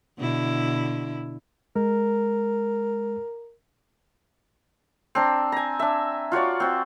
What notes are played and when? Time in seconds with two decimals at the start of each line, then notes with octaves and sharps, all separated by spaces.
0.18 B2 D3 E4
1.76 G#3 A#4
5.15 C4 D4 A#5
5.52 G#5 A#5
5.79 D4 E5
6.32 F4 F#4 C#5 D5
6.60 C4 F#4